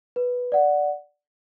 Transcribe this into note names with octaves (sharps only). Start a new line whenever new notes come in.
B4
D5 F#5